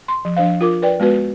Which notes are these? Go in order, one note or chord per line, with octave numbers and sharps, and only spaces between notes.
C6
F3
F3 D4 C5 F5
F4 A#4 D6
B4 D5 G5
G#3 B3 F#4 B4